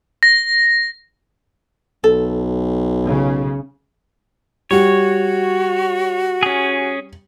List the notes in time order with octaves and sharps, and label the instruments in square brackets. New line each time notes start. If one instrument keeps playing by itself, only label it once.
[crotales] A#6
[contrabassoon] B1 [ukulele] A4
[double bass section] C#3
[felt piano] G3 [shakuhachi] F#4 [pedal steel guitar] C#5
[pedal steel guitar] C#4 G#4